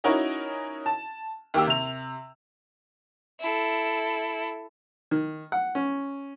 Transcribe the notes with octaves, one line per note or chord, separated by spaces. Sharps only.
C#4 D#4 E4 F#4 A#4 C#5
A5
D#2 A#3 G4 G5 E6
C3 F7
E4 A4
D#3
F#5
C#4